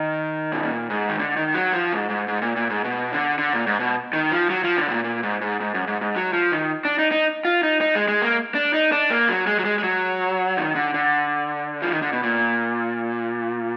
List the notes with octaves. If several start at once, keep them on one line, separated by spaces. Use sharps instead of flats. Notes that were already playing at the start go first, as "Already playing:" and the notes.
Already playing: D#3
B2
A#2
G#2
D#3
D3
D#3
F#3
F3
G#2
G#2
G#2
A#2
A#2
G#2
B2
D3
D3
A#2
G#2
B2
D#3
F3
F#3
F3
D3
G#2
A#2
A#2
G#2
G#2
G#2
F#2
G#2
G#2
F#3
F3
D#3
D4
D#4
D#4
F4
D#4
D#4
G#3
G#3
A#3
D4
D#4
D4
A#3
F#3
G#3
F#3
G#3
G#3
F#3
D#3
D3
D3
F3
D#3
D3
B2
A#2